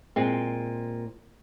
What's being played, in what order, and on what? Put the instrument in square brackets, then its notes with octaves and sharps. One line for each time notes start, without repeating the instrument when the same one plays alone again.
[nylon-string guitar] A#2 G#3 C4